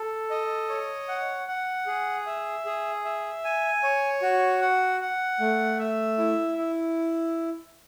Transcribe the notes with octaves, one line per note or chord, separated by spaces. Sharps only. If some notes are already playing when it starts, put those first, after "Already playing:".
Already playing: A4
D#5
C#5
F#5
F#5
G#4
E5
G#4
E5
G#5
C#5
F#4
F#5
F#5
A3
E5
E4
E4